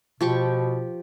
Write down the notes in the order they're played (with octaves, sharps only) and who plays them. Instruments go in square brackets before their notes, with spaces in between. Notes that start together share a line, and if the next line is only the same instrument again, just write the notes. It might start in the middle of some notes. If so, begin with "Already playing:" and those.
[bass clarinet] B2 [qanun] F3 G4 C#6